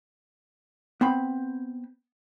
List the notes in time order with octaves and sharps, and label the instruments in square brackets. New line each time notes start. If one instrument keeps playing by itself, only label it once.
[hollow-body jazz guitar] B3 C4 B5